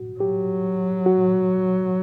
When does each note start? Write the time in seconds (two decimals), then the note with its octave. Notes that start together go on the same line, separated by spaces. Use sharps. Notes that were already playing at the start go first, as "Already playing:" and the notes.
Already playing: F#4
0.20 F#3 G4
1.06 F#4